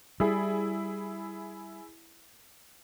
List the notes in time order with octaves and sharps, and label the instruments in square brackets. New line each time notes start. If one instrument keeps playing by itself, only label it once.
[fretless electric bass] G3 [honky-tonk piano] E4 G#4